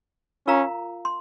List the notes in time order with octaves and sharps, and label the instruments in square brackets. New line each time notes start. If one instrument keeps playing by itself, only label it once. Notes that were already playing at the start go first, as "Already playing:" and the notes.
[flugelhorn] C#4 [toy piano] F4 A#4 F5 A#5
[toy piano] C6